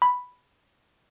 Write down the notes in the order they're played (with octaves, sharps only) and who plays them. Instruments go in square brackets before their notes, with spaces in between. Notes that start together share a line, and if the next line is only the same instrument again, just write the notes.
[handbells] B5